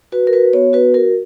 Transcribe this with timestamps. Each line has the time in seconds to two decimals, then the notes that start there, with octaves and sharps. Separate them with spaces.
0.12 F#4 B4
0.27 A#4
0.33 F#4 B4
0.53 B3 C#5
0.73 F#4 B4
0.94 F#4 A#4